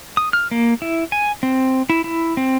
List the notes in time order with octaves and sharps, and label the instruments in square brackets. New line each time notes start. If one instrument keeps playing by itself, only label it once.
[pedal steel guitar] D#6
F6
A#3
E4
G#5
C4
E4
E4
C4